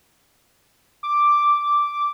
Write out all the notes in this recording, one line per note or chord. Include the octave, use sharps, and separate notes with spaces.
D6